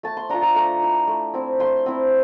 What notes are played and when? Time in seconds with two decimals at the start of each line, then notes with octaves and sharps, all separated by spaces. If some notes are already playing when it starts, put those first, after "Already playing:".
0.03 A3 A5
0.17 C6
0.29 D4 F4 A#5
0.42 A#5
0.55 A3 A#5
0.82 E4
1.08 A3
1.34 C4 E4
1.59 A3 C6
1.86 C4 E4